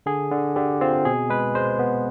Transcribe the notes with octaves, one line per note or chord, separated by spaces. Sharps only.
D3 G#4
D3
D3 G4
C4 F4
B2 G#4
G#3 B4
G#3 C5
B3